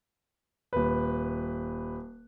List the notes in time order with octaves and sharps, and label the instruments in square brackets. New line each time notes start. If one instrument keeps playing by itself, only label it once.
[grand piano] D#1 B4